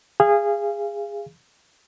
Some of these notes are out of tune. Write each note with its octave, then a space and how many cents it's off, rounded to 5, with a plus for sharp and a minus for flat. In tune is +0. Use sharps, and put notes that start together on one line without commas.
G#4 -20 F5 -25